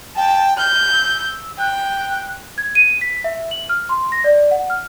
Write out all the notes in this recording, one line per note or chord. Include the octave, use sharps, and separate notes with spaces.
G5 A5
F6 G6
E6
G5 F#6
G#6
D#7
B6
E5
F#7
F6
C6
A#6
D5
F#5
F6